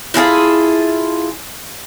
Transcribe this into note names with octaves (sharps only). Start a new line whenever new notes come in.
E4 F4 G#4 A4